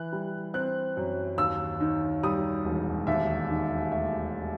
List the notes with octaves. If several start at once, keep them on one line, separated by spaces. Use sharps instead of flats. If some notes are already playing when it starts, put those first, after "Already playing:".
Already playing: E3 F#6
G3
C4 F#6
F#2
D#2 E6
D#3
G3 D#6
E1
D#2 E5
D#3
A3 E5